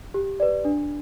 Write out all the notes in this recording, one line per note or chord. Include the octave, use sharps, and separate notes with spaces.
G4
B4 D5
D4